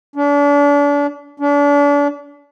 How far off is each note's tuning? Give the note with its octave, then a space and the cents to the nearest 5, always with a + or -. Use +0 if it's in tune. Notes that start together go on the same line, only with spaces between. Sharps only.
D4 -40
D4 -40